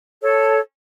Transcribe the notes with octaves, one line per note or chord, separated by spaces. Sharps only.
A4 C#5